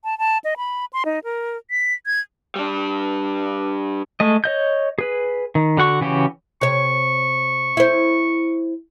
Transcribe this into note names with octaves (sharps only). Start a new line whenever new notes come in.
A5
A5
D#5
B5
C6
D#4
A#4
B6
G#6
G3 D4
G#3 A3 D#5
C#5 D#5 G6
G#4 B4
D#3
D3 F#4 F#5 C#6
C#3 E3 C#4 F#4 G4
C3 C#5 C#6
E4 C5